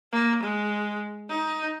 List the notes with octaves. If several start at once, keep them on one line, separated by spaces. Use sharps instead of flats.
A#3
G#3
D#4